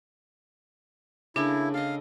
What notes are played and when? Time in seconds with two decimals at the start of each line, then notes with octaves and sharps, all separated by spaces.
1.36 C#3 A3 A#3 D4 E4
1.74 A4 D#5 F5